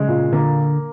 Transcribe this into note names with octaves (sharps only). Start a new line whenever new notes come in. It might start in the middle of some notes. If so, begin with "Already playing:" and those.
Already playing: C#3 G#3
A#2
D3 A#3